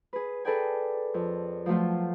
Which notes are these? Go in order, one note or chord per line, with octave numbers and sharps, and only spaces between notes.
G#4 B4
G#4 A4 B4 D5 G5 G#5
F2
F3 F#3 A3 F4